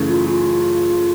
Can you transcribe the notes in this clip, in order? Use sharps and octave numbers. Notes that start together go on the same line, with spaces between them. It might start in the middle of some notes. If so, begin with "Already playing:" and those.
Already playing: F#2 C#3 E3 A3
F4
F4